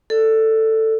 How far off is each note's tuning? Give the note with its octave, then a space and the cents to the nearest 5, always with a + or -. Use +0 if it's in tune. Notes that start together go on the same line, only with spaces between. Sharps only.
A4 +10 D5 +10